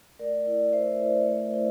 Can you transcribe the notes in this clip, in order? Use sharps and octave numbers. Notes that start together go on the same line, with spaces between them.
A3 A#4 D5
E4
A3 C5 E5
E4
A3
E4